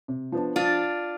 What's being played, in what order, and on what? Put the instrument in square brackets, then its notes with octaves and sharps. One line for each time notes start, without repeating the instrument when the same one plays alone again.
[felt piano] C3
F3 B3 D4
[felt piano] F3 [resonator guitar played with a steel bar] D4 F4